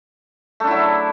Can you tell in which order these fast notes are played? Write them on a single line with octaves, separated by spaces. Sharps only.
A3 D4 E4 F#3